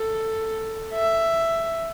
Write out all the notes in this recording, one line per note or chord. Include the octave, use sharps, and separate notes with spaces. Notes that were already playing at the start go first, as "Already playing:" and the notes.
Already playing: A4
E5